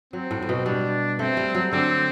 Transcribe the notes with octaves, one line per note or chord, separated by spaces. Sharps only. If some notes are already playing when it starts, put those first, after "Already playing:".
F#3 C4
A2
A2
B2
G3 D4
A3 C4
G3
F#3
D3 C4